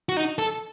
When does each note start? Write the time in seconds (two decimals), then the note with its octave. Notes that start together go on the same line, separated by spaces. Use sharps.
0.09 F#4
0.17 D#4
0.38 A4